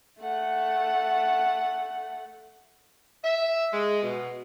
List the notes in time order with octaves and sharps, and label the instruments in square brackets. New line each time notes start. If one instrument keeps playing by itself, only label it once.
[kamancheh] A3 F#5
[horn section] E5
G#3
B2